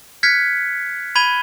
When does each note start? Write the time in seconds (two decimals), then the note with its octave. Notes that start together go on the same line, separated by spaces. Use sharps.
0.23 F6 F#6 G#6 B6 C#7
1.16 B5 G#6 D#7 G7